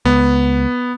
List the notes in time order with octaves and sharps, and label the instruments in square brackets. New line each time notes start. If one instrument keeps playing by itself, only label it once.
[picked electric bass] C#2 [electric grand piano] B3